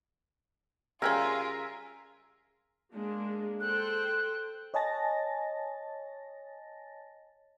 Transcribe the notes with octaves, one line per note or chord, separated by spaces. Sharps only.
C#3 G3 C#4 F4 G#4 A#4 E5 G#5
G#3 A#3 D4
A4 C5 G5 F#6
C#5 D#5 G#5 A5 A6 A#6